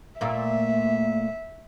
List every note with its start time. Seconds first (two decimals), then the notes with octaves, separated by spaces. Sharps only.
0.21 A#2 A3 A#3 E5